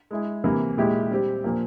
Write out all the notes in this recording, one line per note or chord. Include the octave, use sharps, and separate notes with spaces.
G#3 E4 G#4
C3 E3 A#3
A#2 G#3 E4 G4
G3 C4 G4
A#2 F3 A#3